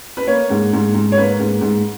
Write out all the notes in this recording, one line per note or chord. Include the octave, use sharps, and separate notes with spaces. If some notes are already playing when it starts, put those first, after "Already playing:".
B4
A#3 C#5
G#2
G#2
G#2
C#5
A#3 B4
G#2
G#2